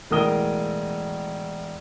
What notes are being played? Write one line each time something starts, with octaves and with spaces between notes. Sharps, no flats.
E1 A2 A#4 D#6 G7